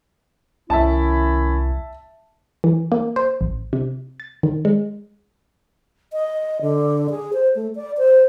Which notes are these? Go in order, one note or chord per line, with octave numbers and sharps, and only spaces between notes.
C2 D#3 C#4 E4 E5 A5
E3
A#3
C5
A1
C3
A6
D#3
G#3
D#5
D3
G#4
C5
A3
D5
C5